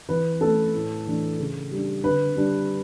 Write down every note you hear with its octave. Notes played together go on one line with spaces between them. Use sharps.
E3 B4
A3 C#4 A4
A2
E3 A3 D4
C#3
G3 D4
D3 B4
G3 D4